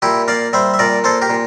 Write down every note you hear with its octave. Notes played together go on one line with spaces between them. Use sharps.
A#2 E4 G4
A#3 D5 F5
G3 C5 E5
E5
A#2 A#4 D5
A#3 A4 C5
G4 A#4
A#2